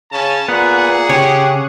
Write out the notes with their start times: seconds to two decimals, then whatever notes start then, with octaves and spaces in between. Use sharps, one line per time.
0.12 C#3 C#4 A5
0.48 A#2 B3 G#4 F#5
1.09 C#3 G4 C#5